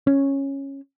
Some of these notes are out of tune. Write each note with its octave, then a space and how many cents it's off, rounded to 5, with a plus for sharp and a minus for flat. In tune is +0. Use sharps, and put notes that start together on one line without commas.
C#4 -10